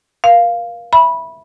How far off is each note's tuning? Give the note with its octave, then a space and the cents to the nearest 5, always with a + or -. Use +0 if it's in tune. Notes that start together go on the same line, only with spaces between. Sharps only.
A#4 +40 F5 +0
E5 +0 B5 -15